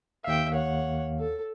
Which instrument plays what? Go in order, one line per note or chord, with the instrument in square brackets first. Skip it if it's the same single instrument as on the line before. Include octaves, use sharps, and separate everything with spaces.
[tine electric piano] D#2 F5 [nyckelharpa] E5 G5
[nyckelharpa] C#5 F#5
A4